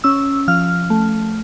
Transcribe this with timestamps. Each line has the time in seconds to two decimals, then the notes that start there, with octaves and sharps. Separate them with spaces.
0.04 C#4 E6
0.48 F3 F6
0.90 A3